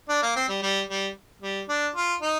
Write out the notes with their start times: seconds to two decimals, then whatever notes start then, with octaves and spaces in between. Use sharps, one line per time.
0.09 D4
0.22 A#3
0.36 C4
0.49 G3
0.62 G3
0.89 G3
1.42 G3
1.69 D4
1.96 F4
2.22 D#4